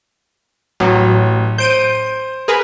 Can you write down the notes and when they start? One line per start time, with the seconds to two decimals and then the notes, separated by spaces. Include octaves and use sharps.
0.80 A1 F#3
1.58 C5 G6 D7 D#7
2.48 G#4 A#4 B4